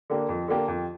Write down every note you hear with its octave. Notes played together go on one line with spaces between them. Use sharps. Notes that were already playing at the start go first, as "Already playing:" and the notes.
D3 A#3 D4 G4
F2
D3 A#3 D4 G4
F2